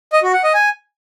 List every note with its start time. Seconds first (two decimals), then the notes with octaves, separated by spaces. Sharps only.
0.13 D#5
0.23 F#4
0.33 F#5
0.44 D#5
0.54 G#5